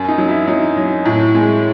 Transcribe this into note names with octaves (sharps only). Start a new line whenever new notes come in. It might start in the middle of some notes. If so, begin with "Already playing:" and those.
Already playing: F#2
D#4
F#3
E4
F#3 D#4
F#3
A2
G#3